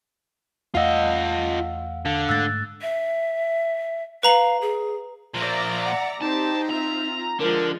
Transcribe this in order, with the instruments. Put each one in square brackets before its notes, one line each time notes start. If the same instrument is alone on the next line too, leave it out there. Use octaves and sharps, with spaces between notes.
[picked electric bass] E2 A3 [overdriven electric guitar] F4 D#5 [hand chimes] F5 F#5 E6
[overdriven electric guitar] D3 [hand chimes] F5
[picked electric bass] G#2 G#3 A3 [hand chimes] E6 F#6 A6
[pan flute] E5
[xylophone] B4 A#5 F#7 [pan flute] F5
[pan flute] G#4
[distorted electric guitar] A#2 F3 [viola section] D5 E5 A#5
[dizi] F#5
[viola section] C4 G4 C5 [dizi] D#4 [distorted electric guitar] A5
[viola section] C4 F4 E5 [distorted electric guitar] A#5
[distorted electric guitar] D3 [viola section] F3 G#3 [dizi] A#4